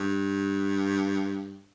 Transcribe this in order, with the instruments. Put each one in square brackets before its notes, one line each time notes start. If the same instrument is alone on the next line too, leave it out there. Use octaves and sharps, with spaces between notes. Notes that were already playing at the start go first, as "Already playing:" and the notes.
Already playing: [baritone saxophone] G2